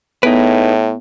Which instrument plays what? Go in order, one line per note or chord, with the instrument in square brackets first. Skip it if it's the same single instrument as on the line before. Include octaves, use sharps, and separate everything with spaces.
[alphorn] A2 [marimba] B3 [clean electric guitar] D#4 G#4 B4